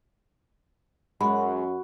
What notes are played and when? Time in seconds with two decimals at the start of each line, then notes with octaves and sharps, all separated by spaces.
1.21 F#2 G#3 F#4 B5